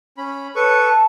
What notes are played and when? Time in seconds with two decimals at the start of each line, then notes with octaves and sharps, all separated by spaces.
0.18 C#4 B5
0.55 A4 B4 C#5 C#6
0.83 A5